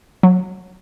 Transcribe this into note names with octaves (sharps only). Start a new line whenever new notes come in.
F#3